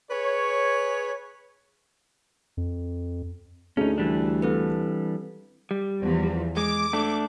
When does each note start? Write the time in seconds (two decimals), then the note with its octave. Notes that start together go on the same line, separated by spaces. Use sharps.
0.11 G#4 B4 C#5
2.57 F2
3.77 D2 A3 C#4 D#4 G#4
3.98 E3 G3 D4
4.42 C4 A4 B4
5.71 G3
6.02 E2 F3
6.57 G#3 D6
6.93 A3 D4